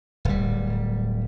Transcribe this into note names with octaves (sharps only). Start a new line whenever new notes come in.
D1 G3